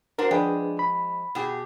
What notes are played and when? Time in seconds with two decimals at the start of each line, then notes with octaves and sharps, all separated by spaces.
0.18 D4 F#4 A#4 C5 F#5
0.31 F3 G#3 D4 G#4 B4 G5
0.79 B5
1.35 B2 G4 G#4